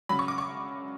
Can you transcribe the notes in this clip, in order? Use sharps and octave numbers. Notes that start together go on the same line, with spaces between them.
C#3 F#3 B5
C#6
D6
C#6